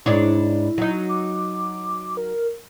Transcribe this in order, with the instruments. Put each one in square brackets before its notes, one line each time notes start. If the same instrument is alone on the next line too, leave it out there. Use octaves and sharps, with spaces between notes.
[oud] G#2 D4 C#5 [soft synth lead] E4
[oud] F#3 D#4
[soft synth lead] D6
A#4